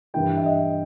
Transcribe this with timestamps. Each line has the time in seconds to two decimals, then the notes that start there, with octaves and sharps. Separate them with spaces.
0.14 G2 E3 A#3 E4 G5
0.37 E5
0.46 D#5